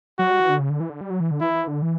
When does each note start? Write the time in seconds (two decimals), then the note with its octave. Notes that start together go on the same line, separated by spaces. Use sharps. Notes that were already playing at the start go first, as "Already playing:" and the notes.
0.19 F#3 F#4
0.30 G3
0.40 E3
0.49 D3
0.59 C#3
0.70 D3
0.80 E3
0.90 D3
1.01 G3
1.10 F#3
1.20 E3
1.31 D3
1.41 E3 E4
1.55 E3
1.67 D3
1.82 E3